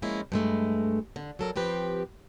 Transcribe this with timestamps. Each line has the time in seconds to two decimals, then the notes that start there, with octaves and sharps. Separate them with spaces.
0.02 F3 G#3 A#3 C#4 E4
0.32 G2 G#3 A3
1.16 D3
1.39 F#3 A4 A#4
1.56 F3 C4 G4 B4